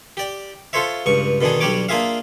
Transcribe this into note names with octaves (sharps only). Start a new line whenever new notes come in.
G4 D5
F4 A4 C5 C#5 E5
C#2 G2 C#6
B2 D3 D#3 D4 G#4
B1 G3 D4 G4 C#5 D6
A#3 D4 F4 G#4 E5 F5